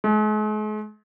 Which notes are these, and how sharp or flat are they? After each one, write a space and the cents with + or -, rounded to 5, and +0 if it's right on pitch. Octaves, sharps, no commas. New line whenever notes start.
G#3 +45